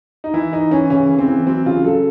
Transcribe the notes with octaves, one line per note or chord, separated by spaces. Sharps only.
D#4
E3 E4
E3 D#4
E3 C#4
C#3 C#4
E3
C4
E3
F#3 C4
C#3 F4
F#3 A4